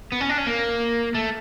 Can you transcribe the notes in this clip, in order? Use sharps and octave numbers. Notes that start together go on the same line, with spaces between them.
B3
C#4
D4
C#4
A#3
A3